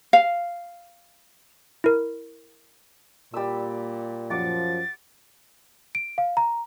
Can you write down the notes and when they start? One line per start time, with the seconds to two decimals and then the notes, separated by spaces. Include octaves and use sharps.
0.13 F5
1.84 E4 A#4
3.34 A#2 G3 B5 E6
4.30 F#2 F3 F#5 D6 A6
5.95 D7
6.18 F5
6.37 A#5